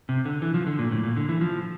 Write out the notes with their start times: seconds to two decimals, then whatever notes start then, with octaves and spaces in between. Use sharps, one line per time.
0.09 C3
0.25 D3
0.42 E3
0.54 F3
0.67 D3
0.79 A#2
0.92 A2
1.03 A#2
1.16 D3
1.29 E3
1.41 F3